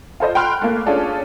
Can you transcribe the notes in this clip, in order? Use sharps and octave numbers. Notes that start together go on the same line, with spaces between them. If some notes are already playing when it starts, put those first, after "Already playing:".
F4 A4 C5 D#5
G5 B5 C6 F6 F#6
A3 A#3
C#4 D4 F4 G#4 A4 D5